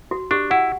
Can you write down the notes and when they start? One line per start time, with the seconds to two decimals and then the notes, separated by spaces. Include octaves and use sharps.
0.11 F#4
0.31 D4 G4
0.51 E4 F#5